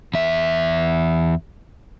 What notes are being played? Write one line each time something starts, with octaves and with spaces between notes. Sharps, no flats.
E2 E5